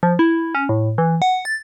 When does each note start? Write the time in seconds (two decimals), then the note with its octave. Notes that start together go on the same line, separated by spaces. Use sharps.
0.03 F3
0.19 E4
0.55 C#4
0.69 A2
0.98 E3
1.22 F#5
1.45 A6